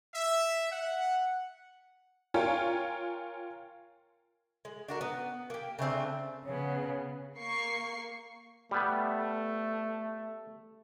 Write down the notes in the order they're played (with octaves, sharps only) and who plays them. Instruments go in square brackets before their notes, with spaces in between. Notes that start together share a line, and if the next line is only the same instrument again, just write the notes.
[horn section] E5
F#5
[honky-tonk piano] F4 A#4 C#5 G5 G#5
[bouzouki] G#3
D4 F#4 A#4
B3
A#3 G4
C#3 A3 C4 D4
[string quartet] C#3 B3 [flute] C#5
[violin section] A#3 C#6 C7
[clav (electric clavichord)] G3 B3 [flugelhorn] A3